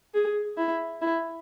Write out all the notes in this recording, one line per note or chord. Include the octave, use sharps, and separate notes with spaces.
G#4
E4
E4